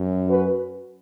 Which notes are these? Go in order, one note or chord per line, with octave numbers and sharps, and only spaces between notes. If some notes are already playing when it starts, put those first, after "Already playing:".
Already playing: F#2
F#3 C#4 F#4 B4